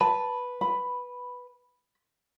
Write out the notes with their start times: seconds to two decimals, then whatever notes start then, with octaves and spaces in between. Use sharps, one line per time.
0.01 B4 A5
0.61 B5